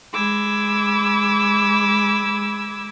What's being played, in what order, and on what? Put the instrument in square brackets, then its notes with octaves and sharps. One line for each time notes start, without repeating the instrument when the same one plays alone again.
[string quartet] G#3 B5 D6 E6 G#6